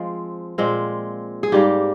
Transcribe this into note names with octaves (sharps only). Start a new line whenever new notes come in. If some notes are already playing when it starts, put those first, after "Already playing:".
Already playing: F3 G#3 C4 C5
A#2 G#3 C4
G#4
G#2 G3 A#3 G4